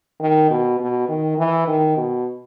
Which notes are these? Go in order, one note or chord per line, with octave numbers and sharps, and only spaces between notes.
D#3
B2
B2
D#3
E3
D#3
B2